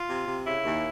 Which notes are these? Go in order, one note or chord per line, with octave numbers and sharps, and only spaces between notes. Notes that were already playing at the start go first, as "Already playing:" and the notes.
Already playing: F4
C3
C3
C#3 E4
D#2